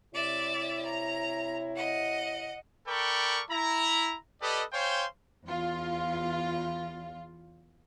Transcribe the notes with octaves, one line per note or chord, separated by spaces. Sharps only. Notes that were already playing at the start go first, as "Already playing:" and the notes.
C3 E4 C#5 D5 E5
A#5
D#5 F#5
A4 A#4 D5 G5 B5 C#6
E4 A#5
G4 A4 B4 D5 D#5
C5 C#5 F5 G5 G#5 C6
E2 F4